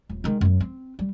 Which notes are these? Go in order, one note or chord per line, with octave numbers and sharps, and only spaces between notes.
D#1
D#3 G#3
F#2 F#3
C4
G3